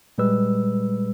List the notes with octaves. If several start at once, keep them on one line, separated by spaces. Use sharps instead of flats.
A#2 G3 G#3 B4 E6